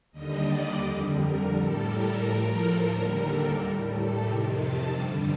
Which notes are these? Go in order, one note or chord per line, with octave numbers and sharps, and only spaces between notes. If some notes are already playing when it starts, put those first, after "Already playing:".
D#2 D3 G3 D#5
D5
F2 D3 G3
A#4
A2 G3 A4
A#4
A2 F3 A#4
A4
D#2 D3 G3 A#4
A4
A2 G3 A#4
A4
F2 C3 D#3 A#4
A5
G2 D3 G3